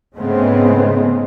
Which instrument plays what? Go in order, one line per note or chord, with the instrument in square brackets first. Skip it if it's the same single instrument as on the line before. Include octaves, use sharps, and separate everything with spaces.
[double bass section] G#2 C#3 G#3 A3 B3 C4